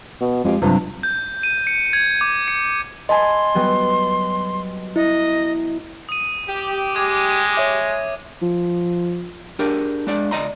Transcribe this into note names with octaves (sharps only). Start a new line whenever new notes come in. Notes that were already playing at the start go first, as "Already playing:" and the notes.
B2
F2 G#3 G4 F5
G2 C3 F3 F#3 B4
G6
D#7
C#7
G#6
D6
C#7
D#5 G#5 A5 B5 C6
F#3 G3 B3
E4 D#5
D#6 D#7
G4
G#3 D6 G#6
C#5 E5
F3
D4 G4 G#4 A#4
G#3 D4 D5
C#2 D5 D#5 A#5 C6